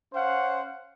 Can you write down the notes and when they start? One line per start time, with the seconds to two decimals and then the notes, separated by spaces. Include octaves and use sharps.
0.13 C#4 C5 F5 F#5